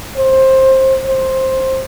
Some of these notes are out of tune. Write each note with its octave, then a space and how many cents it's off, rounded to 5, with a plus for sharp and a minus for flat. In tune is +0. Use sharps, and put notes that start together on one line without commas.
C5 +15
C5 +10